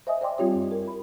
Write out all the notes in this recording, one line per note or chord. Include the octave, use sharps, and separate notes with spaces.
C5 D#5 E5 G#5 D#6
C5 D5 G5 C6 D6
G3 C4 F4 G4 C#5
F#2
A#4
B5